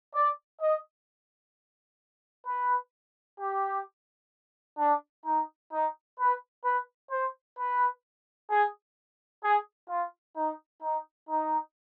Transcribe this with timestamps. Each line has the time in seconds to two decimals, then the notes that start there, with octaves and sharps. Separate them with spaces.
0.15 D5
0.61 D#5
2.47 B4
3.40 G4
4.79 D4
5.26 D#4
5.73 D#4
6.19 B4
6.65 B4
7.12 C5
7.58 B4
8.51 G#4
9.43 G#4
9.90 F4
10.37 D#4
10.83 D#4
11.29 D#4